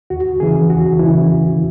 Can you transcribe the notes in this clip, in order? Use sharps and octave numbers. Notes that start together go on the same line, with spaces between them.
D#2 F#4
C#3 E3 G#4
D#2 F#4
C#3 E3 E4